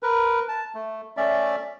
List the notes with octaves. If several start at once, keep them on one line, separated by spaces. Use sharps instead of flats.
A#4 B4
A5
A3
A3 C#4 D5 E5